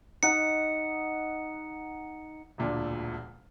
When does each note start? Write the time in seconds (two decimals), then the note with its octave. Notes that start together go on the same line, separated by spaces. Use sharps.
0.23 D#4 F#5 C#7
2.58 E1 D2 A#2 D4